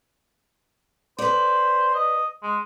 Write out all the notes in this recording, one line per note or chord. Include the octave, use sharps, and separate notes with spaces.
B4 C5 D5
D#5
G#3